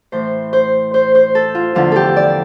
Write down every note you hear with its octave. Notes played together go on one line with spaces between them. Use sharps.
A2 E3 C5
C5
C5
C5
A4
F4
E2 D3 F3 F4
G4 A4
D5